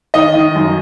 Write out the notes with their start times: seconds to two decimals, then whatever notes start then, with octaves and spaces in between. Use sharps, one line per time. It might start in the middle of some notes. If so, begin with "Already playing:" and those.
0.14 D#3 D#5
0.35 D#3
0.55 F#2